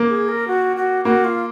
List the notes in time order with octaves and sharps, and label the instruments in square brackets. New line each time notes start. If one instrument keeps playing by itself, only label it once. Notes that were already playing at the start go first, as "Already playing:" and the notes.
Already playing: [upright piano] A#3
[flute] G#4
A#4
F#4
F#4
[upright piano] A#3 [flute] F#4
[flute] F4